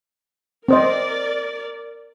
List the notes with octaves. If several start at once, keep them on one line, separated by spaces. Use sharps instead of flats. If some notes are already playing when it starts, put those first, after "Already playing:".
C4 A#4 C5 D5 D#5